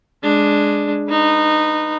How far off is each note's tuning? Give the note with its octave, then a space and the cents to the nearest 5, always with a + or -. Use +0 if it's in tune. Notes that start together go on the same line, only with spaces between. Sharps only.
G#3 +0 D4 +0
D#4 -20 B4 +0